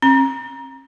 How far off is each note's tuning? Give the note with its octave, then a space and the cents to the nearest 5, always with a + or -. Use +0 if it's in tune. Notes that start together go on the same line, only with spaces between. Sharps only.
C4 +45 A#5 +20